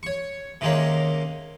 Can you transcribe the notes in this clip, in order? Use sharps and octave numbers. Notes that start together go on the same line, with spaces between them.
C#5 C#6
C3 D#3 G#3 A#3 C#4